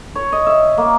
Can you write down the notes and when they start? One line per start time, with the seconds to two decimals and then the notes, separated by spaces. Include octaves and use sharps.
0.15 C#5
0.32 D#5
0.46 E5
0.78 A#3